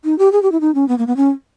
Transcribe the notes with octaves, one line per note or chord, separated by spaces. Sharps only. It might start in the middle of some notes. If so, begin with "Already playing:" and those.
D#4
G4
G#4
G4
E4
D#4
C#4
B3
A#3
B3
C#4